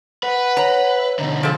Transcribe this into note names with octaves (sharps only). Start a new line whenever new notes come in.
B4 F#5
C#5 A#5
E5
B2 D3 D#4
F3 G#4 A4